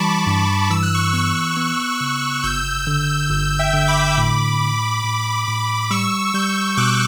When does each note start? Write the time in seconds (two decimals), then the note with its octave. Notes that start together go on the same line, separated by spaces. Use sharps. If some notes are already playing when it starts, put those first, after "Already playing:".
Already playing: E3 G3 A5 B5 C#6 D6
0.27 G2
0.70 E3 E6
0.83 F#6
0.94 C#6 E6
1.13 B3 C#6 E6
1.57 B3
2.01 C#3
2.44 G1 E6 G6
2.87 D3
3.31 G1
3.59 E5 G5
3.74 D3
3.88 B5 D6
4.18 A2
4.61 A2
5.04 A2
5.48 A2
5.91 G3 C#6 E6
6.34 G3 E6 G6
6.77 B2 D6 F#6